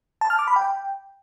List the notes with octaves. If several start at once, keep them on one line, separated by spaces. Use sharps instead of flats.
A5
F6
D6
B5
G5